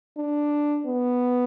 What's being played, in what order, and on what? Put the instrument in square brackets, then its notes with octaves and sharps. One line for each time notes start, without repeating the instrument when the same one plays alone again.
[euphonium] D4
B3